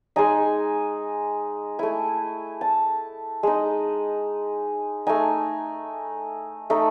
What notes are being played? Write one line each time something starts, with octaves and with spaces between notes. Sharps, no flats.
G#3 D#4 G#5
A3 E4 G#5
A5
G#3 D#4
A3 D#4 G#5
A3 D#4